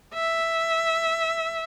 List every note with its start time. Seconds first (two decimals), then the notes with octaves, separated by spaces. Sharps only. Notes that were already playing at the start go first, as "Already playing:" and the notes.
0.14 E5